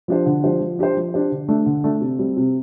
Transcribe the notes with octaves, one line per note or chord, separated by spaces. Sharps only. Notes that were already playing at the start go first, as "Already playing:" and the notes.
F3 D4 G4 C5
D3
F3 D4 G4 C5
F3
D4 G4 C5
F3
D4 G4 C5
D3
A3 D4
D3
A3 D4
C3
G3 C4
C3